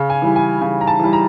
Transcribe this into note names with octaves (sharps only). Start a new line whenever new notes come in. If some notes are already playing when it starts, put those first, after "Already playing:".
Already playing: C#3
G#5
E3 G3
G#5
C#3 G#5
A#5
A5
E3 G3
A#5